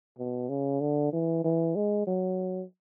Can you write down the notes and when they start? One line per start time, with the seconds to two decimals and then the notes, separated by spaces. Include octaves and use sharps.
0.19 B2
0.49 C#3
0.81 D3
1.13 E3
1.44 E3
1.76 G#3
2.07 F#3